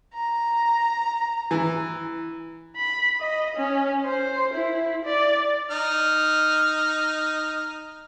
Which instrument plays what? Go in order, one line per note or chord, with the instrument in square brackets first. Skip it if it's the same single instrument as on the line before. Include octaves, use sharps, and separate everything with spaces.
[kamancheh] A#5
[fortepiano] E3
[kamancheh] B5
D#5
C#4
C5
E4
D5
[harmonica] D#4 F6